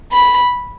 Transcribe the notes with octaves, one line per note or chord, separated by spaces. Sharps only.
B5